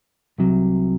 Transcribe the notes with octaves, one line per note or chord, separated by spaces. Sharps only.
C2 C3 F#3